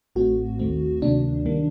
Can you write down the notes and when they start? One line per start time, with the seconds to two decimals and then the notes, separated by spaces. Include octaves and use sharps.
0.16 A1 A2 A3 C4 F#4
0.59 D#2 D#3 A3 C4
1.02 D2 C3 D#3 F#3 A#3 D4
1.46 D#3 G3 A#3